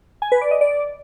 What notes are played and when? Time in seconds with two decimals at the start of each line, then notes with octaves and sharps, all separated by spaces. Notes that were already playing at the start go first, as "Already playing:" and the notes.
0.22 G#5
0.32 B4
0.41 D5
0.51 D#5
0.61 D5